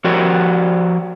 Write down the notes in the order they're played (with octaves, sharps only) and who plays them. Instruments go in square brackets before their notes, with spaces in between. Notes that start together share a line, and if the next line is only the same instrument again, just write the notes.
[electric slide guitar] F3 F#4 G4 A#4 D5